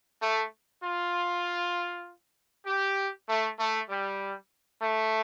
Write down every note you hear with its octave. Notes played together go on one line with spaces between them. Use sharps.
A3
F4
G4
A3
A3
G3
A3